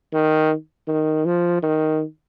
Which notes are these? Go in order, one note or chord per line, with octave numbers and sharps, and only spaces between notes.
D#3
D#3
F3
D#3